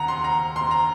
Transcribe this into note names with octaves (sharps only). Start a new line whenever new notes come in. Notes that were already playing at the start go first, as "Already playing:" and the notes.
Already playing: D#2 C#3 F#5 A#5
C6
A#5
C6
A#5